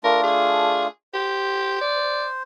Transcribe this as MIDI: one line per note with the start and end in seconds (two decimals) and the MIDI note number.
0.04 0.87 57
0.04 0.87 62
0.04 0.87 65
0.04 0.23 70
0.23 0.85 68
1.14 1.78 67
1.14 2.43 72
1.81 2.26 74